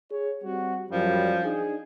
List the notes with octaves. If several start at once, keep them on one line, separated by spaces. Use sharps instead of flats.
G#4 C#5
G3 C4 F#4
F#2 F3 G3
D4 D#4 G#4